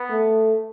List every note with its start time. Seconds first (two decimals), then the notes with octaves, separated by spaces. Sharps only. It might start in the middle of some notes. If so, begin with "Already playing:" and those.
Already playing: B3
0.10 A3